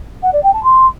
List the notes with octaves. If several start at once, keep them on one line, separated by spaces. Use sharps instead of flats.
F#5
D5
G5
A5
C6